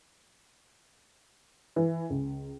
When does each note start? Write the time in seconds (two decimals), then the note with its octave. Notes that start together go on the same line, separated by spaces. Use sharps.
1.76 E3
2.10 C#2